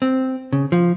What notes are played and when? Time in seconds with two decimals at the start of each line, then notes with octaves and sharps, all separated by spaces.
0.02 C4
0.53 C#3
0.72 F3